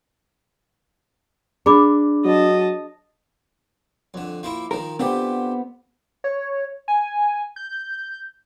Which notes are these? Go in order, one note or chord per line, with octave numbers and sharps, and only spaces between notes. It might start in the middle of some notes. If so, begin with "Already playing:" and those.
D4 G#4 B5 D6
F#3 D#5 A5
F2 D3
F3 A#3 E4
D#3 F3 A#4
D3 B3 C4 F4 G4
C#5
G#5
G6